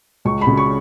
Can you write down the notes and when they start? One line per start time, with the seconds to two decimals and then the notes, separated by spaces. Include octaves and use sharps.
0.25 C#2 C#6
0.41 B5
0.47 C#3
0.57 C#6